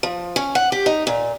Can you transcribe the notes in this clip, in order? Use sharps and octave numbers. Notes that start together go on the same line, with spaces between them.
F3
C#4
F#5
G4
D#4
A#2